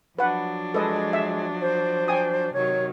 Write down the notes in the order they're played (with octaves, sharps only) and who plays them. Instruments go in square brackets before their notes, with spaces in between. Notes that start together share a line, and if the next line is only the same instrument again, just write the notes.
[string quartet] F3 F#3 D4 [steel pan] B4 F#5
[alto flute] G#3 [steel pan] A4 B4 D#5
[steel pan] E5
[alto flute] C5
[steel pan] G5 G#5 D#6
[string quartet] C3 D#3 F#3 [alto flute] C#5